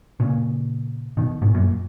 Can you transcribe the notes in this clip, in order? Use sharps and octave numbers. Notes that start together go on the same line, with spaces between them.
A#2 C#3
B2 D#3
G#2 B2
F#2 A#2